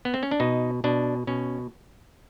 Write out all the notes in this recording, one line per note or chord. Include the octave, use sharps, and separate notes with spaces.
B3
C4
C#4
D4
B2 D#4
B2 D4
B2 C#4